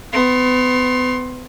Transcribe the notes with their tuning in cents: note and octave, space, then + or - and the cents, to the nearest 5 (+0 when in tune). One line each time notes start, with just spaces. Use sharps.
B3 +35 C6 +25